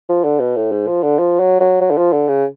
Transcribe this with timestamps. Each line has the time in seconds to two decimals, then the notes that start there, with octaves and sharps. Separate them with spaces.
0.09 F3
0.24 D3
0.40 B2
0.56 A2
0.71 G#2
0.87 F3
1.03 D3
1.19 F3
1.39 F#3
1.60 F#3
1.81 F#3
1.91 D3
1.97 F3
2.13 D3
2.28 C#3